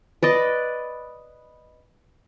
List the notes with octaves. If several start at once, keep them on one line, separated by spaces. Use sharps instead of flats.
B4 D5 D#5